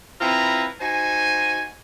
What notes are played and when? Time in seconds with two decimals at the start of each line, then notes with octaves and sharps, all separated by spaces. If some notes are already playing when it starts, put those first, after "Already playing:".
0.21 C4 E4 F4 B4 A#5
0.81 D#4 F#4 C5 G#5